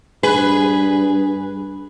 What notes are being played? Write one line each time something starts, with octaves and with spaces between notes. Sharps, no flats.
G2 G#4 B4